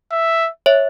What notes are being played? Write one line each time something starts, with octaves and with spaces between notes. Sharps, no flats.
E5
C#5 E5